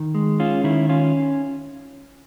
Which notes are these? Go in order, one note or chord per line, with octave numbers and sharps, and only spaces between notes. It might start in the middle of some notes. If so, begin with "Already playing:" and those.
Already playing: D#3
G#3
C#4 F4
D#3 E4
C#4 F4